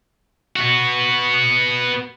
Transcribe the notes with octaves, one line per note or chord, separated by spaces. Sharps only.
B3 F#4